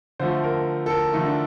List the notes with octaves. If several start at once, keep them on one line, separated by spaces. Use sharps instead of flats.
D3 F3 A3 C5
A#4
A4
A#4
D3 F3 A3 D#4
D4